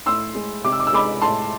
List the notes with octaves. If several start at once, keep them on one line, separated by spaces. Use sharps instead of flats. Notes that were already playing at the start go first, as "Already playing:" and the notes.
A2 C6 E6
G#3
C3 D6
E6
D6
E6
G#3 B5 D6
A2 A5 C6